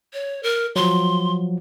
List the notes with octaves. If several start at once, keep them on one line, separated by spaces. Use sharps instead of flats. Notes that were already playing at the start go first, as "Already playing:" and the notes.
C#5
A#4
F3 F#3 C6